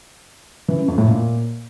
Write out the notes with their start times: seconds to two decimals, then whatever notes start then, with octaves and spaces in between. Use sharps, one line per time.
0.68 E3
0.78 F#2
0.88 F2
0.98 A2
1.08 A#2